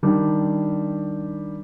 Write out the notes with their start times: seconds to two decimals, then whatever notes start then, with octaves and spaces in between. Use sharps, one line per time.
0.03 D#3 G3 D4